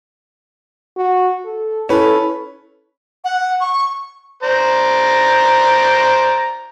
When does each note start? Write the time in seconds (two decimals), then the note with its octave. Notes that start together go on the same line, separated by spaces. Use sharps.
0.97 F#4
1.45 A4
1.89 C#4 E4 A4 B4
3.24 F#5
3.61 C#6
4.43 C5 D5 A#5